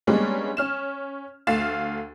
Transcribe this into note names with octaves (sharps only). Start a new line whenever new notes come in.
G3 G#3 A#3 B3 C#4 D4
C#4 F6 E7
D2 A3 F5 A6 E7